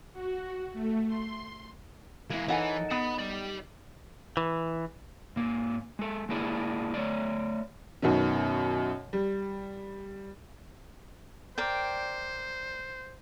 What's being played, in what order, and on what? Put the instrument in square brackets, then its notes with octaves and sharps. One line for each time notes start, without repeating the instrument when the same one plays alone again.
[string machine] F#4
A3
C6
[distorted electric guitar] E3 G#3 [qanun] A#3 E4
[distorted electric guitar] E3 [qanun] D#4 A4 A#4 [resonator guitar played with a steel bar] C#5 F#5 G#5
[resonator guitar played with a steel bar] B3 [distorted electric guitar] F#5 B5
[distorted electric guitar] G4 D5
[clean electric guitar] E3
[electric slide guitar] G#2 A#3
G#3 A4
G#3 A#3 D4 E4 G#4 D5
A3 C#5 D5
[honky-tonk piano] F#2 B2 D#3 C#4
G3
[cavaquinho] A#4 D5 G5 [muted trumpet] C5